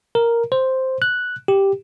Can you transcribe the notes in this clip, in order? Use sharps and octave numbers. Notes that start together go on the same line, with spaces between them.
A#4
C5
F#6
G4